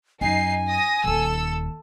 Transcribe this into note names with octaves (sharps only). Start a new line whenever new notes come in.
F#2 D#4 G#5 C7
D#6 A#6
D#1 D#3 A4 E6